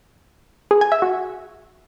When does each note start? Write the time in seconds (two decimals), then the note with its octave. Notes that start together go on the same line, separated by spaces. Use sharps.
0.71 G#4
0.81 G#5
0.92 E5
1.02 F#4